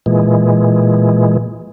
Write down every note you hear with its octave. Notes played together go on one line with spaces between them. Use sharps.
A#2 E3 G#3